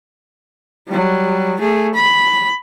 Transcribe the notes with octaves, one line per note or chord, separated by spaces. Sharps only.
F#3 G3
A3 G#4
B5